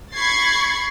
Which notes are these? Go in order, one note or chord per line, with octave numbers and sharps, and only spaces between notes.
B5 C#6 G#6 A6 C7